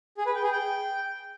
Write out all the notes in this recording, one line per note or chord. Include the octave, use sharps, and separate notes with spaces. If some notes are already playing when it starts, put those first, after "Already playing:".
G#4
B4
G5
G#4
G5